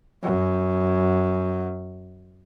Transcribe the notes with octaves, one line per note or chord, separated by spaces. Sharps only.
F#2